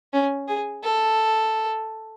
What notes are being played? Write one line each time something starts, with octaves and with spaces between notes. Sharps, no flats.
C#4
G#4
A4